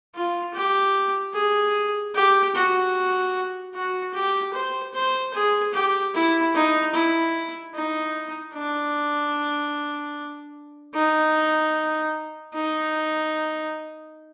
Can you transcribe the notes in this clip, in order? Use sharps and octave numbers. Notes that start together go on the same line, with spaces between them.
F4
G4
G#4
G4
F#4
F#4
G4
C5
C5
G#4
G4
E4
D#4
E4
D#4
D4
D#4
D#4